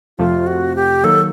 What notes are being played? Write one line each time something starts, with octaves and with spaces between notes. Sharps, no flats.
F2 C3 F3 A3 F4
F#4
G4
D#3 F#3 A#3 A4